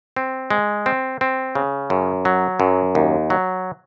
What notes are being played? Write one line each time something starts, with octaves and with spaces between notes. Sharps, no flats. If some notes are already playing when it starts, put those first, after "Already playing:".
C4
G#3
C4
C4
C#3
F#2
F#3
F#2
D#2
F#3